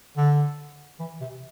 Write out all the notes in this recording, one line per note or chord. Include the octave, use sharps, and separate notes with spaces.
D3
E3
C3